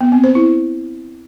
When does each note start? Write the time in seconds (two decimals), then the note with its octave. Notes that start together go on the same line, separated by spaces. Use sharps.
0.01 B3
0.12 C4
0.24 C5
0.35 E4